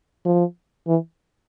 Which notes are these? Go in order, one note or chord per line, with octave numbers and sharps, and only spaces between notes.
F3
E3